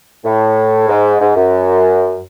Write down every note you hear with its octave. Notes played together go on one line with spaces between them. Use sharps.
A2
G#2
G#2
F#2